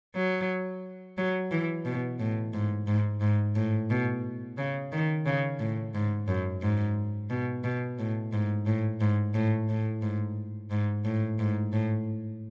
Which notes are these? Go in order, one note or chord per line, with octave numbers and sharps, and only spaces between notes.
F#3
F#3
E3
B2
A2
G#2
G#2
G#2
A2
B2
C#3
D#3
C#3
A2
G#2
F#2
G#2
B2
B2
A2
G#2
A2
G#2
A2
A2
G#2
G#2
A2
G#2
A2